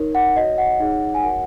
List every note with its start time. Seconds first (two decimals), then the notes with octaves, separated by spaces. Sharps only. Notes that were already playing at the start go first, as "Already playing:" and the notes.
Already playing: D#4 A#4 C#5
0.15 F#5
0.36 F#4 C#5 D#5
0.58 F#5
0.80 D#4 G#4 C#5
1.14 G#5
1.23 F#4 A#4 C#5 F#5